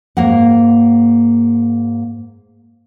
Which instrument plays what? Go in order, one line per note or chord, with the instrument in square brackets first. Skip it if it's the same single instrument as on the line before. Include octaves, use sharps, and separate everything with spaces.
[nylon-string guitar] G#2 A#3 F#5